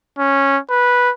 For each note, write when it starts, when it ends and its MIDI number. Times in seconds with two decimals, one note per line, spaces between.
0.18 0.58 61
0.70 1.11 71